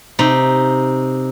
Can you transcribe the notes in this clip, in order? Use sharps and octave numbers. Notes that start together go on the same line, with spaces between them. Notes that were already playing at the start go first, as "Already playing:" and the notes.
C3 D#4